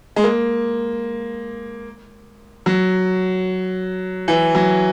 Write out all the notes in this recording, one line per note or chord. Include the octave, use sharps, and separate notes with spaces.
G#3
A#3
F#3
E3
F#3